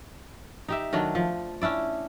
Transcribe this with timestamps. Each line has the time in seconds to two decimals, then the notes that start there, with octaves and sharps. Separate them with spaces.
0.68 D#4 G4 E5
0.93 D#3 F#3 A3 D4
1.15 F3
1.61 C#4 D4 E4 D5